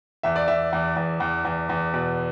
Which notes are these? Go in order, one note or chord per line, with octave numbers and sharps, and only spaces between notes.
E2 E5
D5
E2 E5
E2
E2
E2
E2
E2
B2